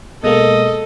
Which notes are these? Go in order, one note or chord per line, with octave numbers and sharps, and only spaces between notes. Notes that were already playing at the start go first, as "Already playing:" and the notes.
B2 G#3 A#3 A4 D#5